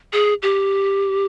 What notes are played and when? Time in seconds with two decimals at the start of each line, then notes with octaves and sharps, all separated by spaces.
0.13 G#4
0.42 G4